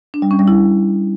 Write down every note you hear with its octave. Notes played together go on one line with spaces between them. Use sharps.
D4
G3
C#4
G3
E4